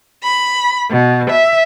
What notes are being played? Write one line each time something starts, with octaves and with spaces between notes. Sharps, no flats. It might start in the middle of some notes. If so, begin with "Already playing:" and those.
B5
B2
E5